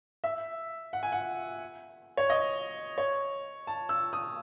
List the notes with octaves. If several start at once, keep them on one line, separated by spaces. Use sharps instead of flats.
E5
F#5
G#5
F#5
C#5
D#5
C#5
A5
E6
D#6